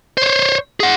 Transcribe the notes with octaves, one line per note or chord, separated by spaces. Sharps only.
C5 C#5
G#4 F#5